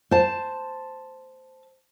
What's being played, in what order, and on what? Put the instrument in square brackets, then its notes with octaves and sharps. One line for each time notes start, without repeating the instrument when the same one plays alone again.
[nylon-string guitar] C5 A5